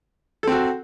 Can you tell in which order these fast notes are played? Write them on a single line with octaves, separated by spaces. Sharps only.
A4 C4 F#4